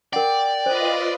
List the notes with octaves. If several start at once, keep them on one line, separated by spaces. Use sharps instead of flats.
A#4 D5 F#5 G5
F4 B4 C5 D#5